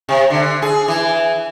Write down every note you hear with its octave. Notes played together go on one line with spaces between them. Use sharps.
C3
D3
G#4
E3